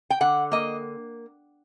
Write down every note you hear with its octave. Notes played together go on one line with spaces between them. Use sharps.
G5
D3 F#5
A#3 D#5